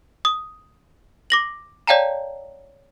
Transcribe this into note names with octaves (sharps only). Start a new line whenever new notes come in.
D#6
D6 A#6 F#7
C#5 D5 F5 G5 A5 A#5